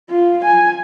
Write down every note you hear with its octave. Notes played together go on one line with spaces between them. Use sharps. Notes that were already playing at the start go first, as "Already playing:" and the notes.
F4
G#5